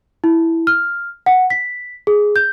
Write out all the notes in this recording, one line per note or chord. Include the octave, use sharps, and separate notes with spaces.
E4
F6
F#5
B6
G#4
G6